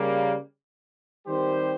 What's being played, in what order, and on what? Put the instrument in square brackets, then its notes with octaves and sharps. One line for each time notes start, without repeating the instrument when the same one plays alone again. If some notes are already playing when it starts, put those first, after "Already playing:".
Already playing: [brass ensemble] C#3 G3 A#3
D#3 G3 C4 G4 C5